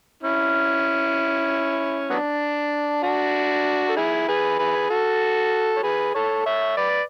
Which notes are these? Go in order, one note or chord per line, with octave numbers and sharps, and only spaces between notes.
C#4 E4
F#3 B3 D4
D4 F#4
A4
E4 G#4
G#4 B4
G#4 B4
F#4 A4
C#5
G#4 B4
A4 C#5
C#5 E5
B4 D5